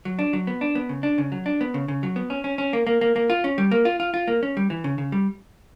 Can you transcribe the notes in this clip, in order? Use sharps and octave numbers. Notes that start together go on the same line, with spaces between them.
F#3
D4
F#3
B3
D4
B3
C#3
D4
C#3
F#3
D4
B3
C#3
C#3
F#3
B3
C#4
C#4
C#4
A#3
A#3
A#3
A#3
F4
C#4
G3
A#3
F4
F4
F4
A#3
C#4
G3
E3
C#3
C#3
G3